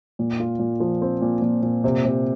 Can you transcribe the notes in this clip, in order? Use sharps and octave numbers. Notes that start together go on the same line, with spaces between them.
A#2
F4
A#2
F3
C4
A#2
A#2
A#2
C3
C3